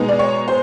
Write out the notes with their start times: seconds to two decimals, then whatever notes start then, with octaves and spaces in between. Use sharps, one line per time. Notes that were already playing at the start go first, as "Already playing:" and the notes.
Already playing: B2 G#3 B3 D#4
0.08 D5
0.19 C#5
0.48 C5